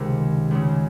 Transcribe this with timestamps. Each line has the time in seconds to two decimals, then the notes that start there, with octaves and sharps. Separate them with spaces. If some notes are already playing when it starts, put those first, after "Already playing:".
Already playing: C#2 C3 D#3 G4
0.51 C#2 C#3